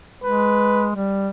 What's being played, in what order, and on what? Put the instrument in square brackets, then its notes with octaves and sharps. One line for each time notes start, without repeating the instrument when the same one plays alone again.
[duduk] G#3 [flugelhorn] B4
[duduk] G3